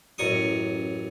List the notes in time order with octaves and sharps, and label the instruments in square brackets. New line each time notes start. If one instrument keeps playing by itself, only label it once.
[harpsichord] A1 F#2 C#6 D#6